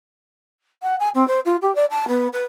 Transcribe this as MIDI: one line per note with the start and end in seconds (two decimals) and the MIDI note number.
0.83 0.96 78
1.00 1.09 80
1.15 1.26 60
1.28 1.40 72
1.45 1.56 65
1.62 1.73 67
1.75 1.86 74
1.91 2.08 81
2.08 2.28 59
2.33 2.44 71